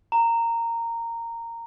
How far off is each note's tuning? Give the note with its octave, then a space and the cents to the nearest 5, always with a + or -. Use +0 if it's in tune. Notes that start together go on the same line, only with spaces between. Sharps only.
A#5 -15